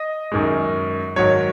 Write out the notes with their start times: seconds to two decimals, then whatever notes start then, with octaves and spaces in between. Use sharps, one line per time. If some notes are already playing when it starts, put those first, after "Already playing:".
Already playing: D#5
0.32 F#2 D#3 G#3
1.16 G#2 D#3 F#3 C#5